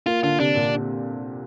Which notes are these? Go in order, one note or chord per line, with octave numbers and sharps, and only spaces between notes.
A#3 F4
D3 F4
C3 D4
A#2